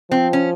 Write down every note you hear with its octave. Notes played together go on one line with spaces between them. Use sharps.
F3 C4
C#4